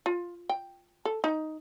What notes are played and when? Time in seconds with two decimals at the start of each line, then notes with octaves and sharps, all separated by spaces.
0.06 F4
0.49 G5
1.05 A4
1.24 D#4